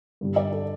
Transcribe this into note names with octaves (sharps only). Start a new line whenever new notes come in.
G2 D3 G3
D5
A4